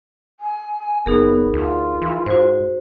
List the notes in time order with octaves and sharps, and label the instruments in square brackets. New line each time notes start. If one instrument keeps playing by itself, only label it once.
[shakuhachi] G#5
[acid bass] F#1 [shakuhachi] B3 [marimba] D#4 G#4 A#4
[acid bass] D2 [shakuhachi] F4
[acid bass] E3
[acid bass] G#2 [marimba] F#4 C5